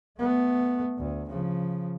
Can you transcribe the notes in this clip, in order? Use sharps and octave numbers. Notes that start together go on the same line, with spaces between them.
A3 B3
D2
C#3 F3